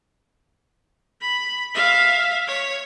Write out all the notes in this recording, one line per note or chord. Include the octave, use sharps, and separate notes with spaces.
B5
E5 F5
C#5